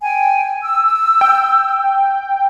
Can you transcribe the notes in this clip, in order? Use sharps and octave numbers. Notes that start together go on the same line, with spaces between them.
G5 G#5
E6
G5